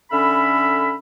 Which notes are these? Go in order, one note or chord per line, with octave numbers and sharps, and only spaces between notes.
D3 C#4 A4 E5 B5